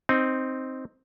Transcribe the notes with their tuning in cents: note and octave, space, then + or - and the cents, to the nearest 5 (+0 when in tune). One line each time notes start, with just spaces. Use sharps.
C4 +0 D#4 +0